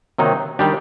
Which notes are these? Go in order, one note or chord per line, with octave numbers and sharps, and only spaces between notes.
C3 D#3 F#3 A#3 D#4
D#3 G3 D4 G4